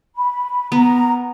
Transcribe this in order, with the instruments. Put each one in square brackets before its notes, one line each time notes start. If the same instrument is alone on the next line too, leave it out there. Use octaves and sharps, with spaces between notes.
[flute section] B5
[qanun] B3 [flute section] A#5